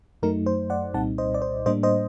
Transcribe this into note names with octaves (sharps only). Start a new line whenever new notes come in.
F#2 F#3 A3 D#4 A#4
C5
D5 F#5
C2 A#2 G3 C4 D#4 F#5 A5
C5 D#5
D5
C5
A2 G3 A#3 D4 C5 D#5
C5 D#5